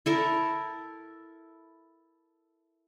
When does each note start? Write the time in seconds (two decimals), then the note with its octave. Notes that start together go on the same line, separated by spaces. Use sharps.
0.06 E4 A4 A#4